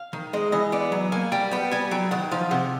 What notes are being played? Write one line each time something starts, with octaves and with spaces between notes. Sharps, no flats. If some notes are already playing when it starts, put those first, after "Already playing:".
Already playing: F5
D#3
G#3 D#5
E3 D#5
B3 D5
F#3
A#3 G#5
G3 G5
B3 G5
G3 G#5
F#3 G5
D#3 F#5
F3 F5
C3 F#5